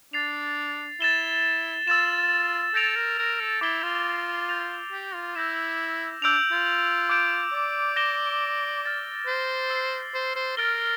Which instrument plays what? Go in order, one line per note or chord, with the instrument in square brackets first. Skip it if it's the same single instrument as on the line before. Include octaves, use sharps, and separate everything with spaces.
[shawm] D4 [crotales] A6 C7 F7
[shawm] E4 [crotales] A6 E7 G7
[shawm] F4 [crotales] E6 A6 E7
[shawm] A4 [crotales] G6 A#6 D7 F7
[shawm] A#4
A#4
A4
[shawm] E4 [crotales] D6 A6 C7 G7
[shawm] F4
[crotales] G6 A#6 F7
[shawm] G4
F4
[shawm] E4 [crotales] E6 G6 A#6 E7
[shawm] D4 [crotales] E6 G6 D7 F7
[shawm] F4
[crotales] D6 G6 D7
[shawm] D5
[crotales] G6 A#6 E7 G7
F6 A6 E7
[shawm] C5
[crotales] E6 A6 C7 G7
[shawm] C5
C5
[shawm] A#4 [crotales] F6 A6 D7 G7